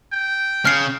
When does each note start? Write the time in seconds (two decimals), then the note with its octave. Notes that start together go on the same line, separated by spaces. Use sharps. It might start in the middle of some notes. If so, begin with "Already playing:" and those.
0.13 G5
0.65 C#3 F6 C7